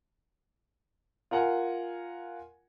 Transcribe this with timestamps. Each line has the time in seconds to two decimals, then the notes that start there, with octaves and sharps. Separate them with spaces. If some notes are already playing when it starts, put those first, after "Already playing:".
1.31 F4 A#4 F#5 G#5